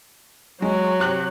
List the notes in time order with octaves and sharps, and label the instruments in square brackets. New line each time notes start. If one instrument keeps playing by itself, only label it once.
[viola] F#3 [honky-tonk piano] G#3
[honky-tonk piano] C3 F#6 F#7